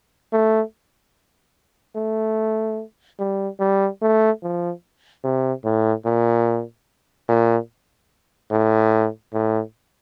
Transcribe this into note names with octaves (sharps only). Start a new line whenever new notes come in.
A3
A3
G3
G3
A3
F3
C3
A2
A#2
A#2
A2
A2